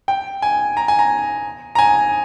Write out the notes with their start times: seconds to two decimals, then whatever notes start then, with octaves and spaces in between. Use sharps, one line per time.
0.08 G5
0.42 G#5
0.77 A#5
0.88 G#5
0.99 A#5
1.75 A#5
1.79 G#5